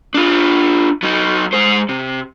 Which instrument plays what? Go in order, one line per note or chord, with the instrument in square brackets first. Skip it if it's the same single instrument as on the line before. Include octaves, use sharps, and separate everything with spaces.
[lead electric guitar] D4 F4
F#3 D#4
G#3 C5
C3